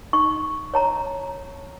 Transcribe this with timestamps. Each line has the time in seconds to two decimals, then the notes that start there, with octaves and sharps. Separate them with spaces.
0.13 D#4 C#6
0.74 C#5 A5 A#5